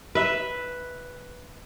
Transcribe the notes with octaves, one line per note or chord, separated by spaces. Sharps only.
B4 E5